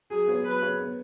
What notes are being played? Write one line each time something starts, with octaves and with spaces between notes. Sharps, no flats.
F#3 G#4
B3 G#4 C#5
F#3 B4
B3 G#4 C#5
B3